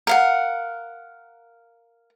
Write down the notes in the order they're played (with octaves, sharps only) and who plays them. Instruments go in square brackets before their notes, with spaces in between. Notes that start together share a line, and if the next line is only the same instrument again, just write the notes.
[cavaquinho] A#4 F5 F#5